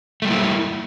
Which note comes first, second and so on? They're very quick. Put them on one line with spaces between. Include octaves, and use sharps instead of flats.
A3 G3 A#3 E4